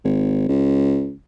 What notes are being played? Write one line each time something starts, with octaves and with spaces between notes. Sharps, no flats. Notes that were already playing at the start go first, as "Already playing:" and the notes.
G#1
C#2